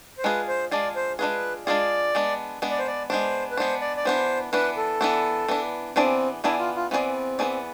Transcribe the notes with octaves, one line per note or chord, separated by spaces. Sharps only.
C5
G#3 D4 F4 G#4 B4
C5
G#3 D4 F4 G#4 D5
C5
G#3 D4 F4 G#4 B4
G#3 D4 F4 G#4 D5
G#3 B3 D4
G#3 B3 D4
D5
C5
D5
G#3 B3 D4 C5
B4
G#3 B3 D4 C5
D5
D5
E3 B3 D4 C5
E3 B3 D4 B4
A4
E3 B3 D4
E3 B3 D4
E3 B3 C4 D4 G#4 D5
E3 B3 D4 E4 G#4 D5
F4
F4
E3 B3 C4 D4 G#4 D5
E3 B3 D4 G#4 D5